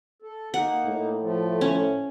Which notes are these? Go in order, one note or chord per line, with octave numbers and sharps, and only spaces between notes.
A4
A#3 D#4 F#5
A2
F3 A3
C#4